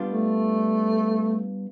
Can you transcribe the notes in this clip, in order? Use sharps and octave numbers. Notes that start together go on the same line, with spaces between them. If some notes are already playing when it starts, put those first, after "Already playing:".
Already playing: G3 B3 D4 F4
A3